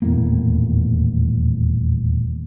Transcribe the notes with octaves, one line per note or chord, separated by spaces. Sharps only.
D#1 E2 A2 A#3